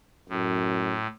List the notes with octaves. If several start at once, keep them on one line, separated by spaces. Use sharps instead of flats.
F#2 A2